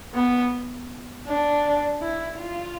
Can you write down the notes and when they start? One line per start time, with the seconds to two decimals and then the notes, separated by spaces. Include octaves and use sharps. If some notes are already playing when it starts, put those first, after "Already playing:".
0.14 B3
1.26 D4
2.01 E4
2.39 F4